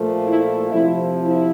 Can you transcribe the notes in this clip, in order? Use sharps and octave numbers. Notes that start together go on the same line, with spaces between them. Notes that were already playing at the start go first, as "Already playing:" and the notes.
Already playing: A#2 F3 A3
E4
F2 C3 F3 E4
E4